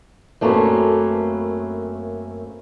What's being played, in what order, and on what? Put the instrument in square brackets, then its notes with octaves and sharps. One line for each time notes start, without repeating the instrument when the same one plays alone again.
[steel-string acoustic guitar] F#2 A3 A#3 C4 C#4 B4